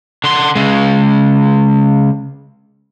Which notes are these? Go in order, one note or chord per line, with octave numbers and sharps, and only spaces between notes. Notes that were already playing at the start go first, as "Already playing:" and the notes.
D3 C6
C#3 G#3